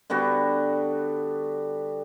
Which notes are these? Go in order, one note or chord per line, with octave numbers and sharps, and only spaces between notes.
D3 G3 B3 F#4